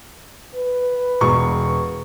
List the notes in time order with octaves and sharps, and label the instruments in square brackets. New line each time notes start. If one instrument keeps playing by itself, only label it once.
[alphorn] B4
[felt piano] E1 C#6